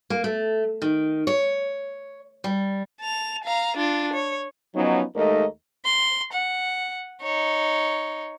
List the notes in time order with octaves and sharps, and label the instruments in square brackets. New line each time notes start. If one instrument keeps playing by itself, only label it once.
[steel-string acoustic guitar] A#3
A3
D#3
C#5
G3
[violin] A5 F7
F5 A#5
D4 F4
C#5
[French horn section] F3 F#3 B3 C#4 D#4
D#2 G#3 A3 D#4 A#4 D#5
[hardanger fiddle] C6
F#5
D#4 C#5